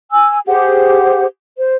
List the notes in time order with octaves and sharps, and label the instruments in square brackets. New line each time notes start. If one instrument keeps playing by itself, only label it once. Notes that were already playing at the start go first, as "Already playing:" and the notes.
[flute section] G#5 E6
G4 G#4 C5 F#5
C5